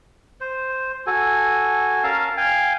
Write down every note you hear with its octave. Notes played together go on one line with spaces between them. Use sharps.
C5
F#4 A4 G#5
C#4 A#4 F5 A5
F5 G5 G#5